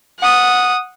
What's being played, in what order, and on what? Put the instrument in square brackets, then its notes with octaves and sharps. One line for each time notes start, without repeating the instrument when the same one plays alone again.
[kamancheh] F#5 D#6